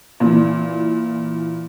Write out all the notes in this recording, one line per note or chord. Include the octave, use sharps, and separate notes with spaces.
A#2 E3